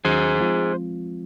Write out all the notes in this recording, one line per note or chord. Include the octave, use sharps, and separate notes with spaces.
D#2 D#3 F#3 C#4 F#4 G#4 C5
F3 G#3 C4 F4